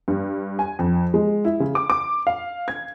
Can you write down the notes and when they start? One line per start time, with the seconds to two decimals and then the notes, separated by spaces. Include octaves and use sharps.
0.08 G2
0.59 G#5
0.79 F2
1.14 G#3
1.45 E4
1.60 C#3
1.75 D6
1.90 D6
2.27 F5
2.68 G#6